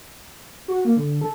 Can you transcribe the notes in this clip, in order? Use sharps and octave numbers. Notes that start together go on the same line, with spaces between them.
F#4
A#3
D3
A4